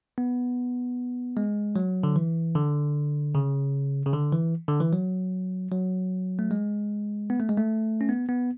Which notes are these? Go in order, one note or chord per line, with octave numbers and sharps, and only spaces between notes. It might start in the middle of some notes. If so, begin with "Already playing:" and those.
B3
G#3
F#3
D3
E3
D3
C#3
C#3
D3
E3
D3
E3
F#3
F#3
A3
G#3
B3
A3
G#3
A3
C#4
B3
B3